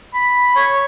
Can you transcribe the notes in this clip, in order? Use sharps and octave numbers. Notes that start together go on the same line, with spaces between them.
B5
C#5